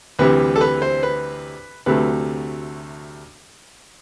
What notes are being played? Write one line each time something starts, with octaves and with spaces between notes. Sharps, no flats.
D2 C3 E3 G3 B4
A4
B4
C5
B4
D2 C3 F#3 A3 B4